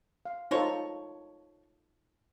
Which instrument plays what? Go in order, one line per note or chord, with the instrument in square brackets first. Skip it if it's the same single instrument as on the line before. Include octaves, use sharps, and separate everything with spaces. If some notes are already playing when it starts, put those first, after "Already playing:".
[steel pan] F5
[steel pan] D#4 F4 A4 [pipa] A#4 C5 C#5